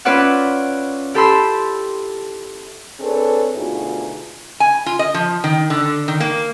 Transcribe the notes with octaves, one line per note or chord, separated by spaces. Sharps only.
C#4 F4 B4 D5 E5 F#5
E4 G4 A4 B5 C6 E6
C4 D4 G#4 A4 B4 C#5
D2 B2 D#4 F4 F#4 G#4
G#5
F4
D#5
F3
D#3
D3
D#3
A#3